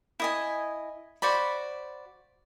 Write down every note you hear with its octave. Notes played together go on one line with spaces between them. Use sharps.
E4 D#5 G#5
F#4 C5 D5 B5